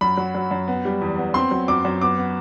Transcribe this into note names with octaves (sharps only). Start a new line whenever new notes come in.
F#2 B5
F#3
F#3
F#2
B3
G3
E2
B3
C4 C6
F#3
F#2 D6
F#2
B3 D6
B3